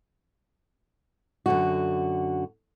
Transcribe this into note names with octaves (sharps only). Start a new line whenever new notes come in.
F#2 D3 F#4